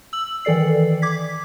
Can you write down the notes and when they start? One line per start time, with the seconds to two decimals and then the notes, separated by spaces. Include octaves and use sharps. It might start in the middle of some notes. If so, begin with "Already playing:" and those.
0.13 E6 F#7
0.45 D#3 E3 A4 D5 C7
1.02 D6 G#6 B6